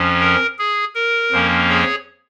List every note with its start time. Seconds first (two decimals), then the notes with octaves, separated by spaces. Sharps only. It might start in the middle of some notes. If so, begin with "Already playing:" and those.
Already playing: F2 F3 C#4
0.21 A#4
0.59 G#4
0.95 A#4
1.32 F2 F3 A#3 C#4
1.69 G#4 C#5